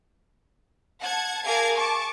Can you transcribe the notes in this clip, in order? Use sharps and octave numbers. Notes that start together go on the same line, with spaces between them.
F#5 A5 G#6
G#4 A#4 F5 A5 D6 G#6
A5 C#6 D6